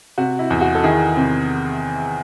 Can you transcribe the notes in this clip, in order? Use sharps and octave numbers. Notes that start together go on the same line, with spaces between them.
C3 F#4
E4
E2
F#4
A4
D#3 E4 G#4
C3